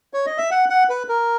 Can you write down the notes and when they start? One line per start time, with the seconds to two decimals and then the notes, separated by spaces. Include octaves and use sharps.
0.14 C#5
0.26 D#5
0.38 E5
0.51 F#5
0.70 F#5
0.90 B4
1.09 A#4